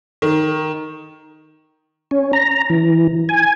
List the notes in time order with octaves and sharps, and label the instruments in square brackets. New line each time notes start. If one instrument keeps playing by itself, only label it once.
[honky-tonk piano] D#3
[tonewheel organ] C#4
A#5
E3
G#5